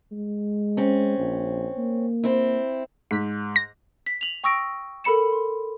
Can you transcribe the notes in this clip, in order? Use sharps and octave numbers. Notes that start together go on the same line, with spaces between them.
G#3
C4 C#4
A#1
A#3
C4 E4
G#2 B6
A#6
B6
F7 F#7
G5 C#6 D#6 E6 A#6 D7
A4 A#4 B5 C#7 E7
C6